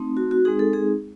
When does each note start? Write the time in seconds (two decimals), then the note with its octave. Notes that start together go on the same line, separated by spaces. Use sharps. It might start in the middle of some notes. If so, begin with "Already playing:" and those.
Already playing: A3 C4 D#4
0.17 F#4
0.31 F#4
0.45 G#3 C4 D#4 G#4
0.59 A4
0.73 G#4